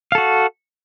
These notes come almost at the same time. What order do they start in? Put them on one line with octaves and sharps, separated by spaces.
F5 A4 F#4